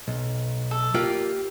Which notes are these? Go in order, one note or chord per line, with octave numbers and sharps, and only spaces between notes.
B1
A4
A#3 F4 G4 D5